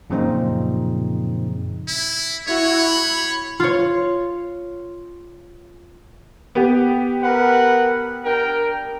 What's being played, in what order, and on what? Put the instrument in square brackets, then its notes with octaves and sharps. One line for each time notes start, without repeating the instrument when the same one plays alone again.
[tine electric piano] F#2 A#2 C#3 F3 C4 D#4
[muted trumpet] E4
[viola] E4 F#4 [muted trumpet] C#5
[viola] B5
[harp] F4 C#5
[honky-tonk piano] B3 G4
[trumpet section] A#4 B4 F#5
D4 A#4 G5